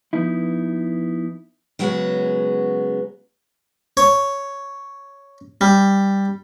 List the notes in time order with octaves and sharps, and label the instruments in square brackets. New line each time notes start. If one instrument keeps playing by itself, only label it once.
[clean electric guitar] F3 B3 D#4 E4
[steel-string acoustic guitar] C#3 F#3 G#3 B3 F#4
[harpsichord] C#5
G3